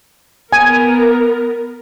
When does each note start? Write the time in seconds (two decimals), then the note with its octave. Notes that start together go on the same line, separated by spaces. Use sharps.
0.53 B3 A#4 G#5